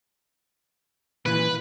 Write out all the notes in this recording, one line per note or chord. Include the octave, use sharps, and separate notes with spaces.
A#2 E3 B4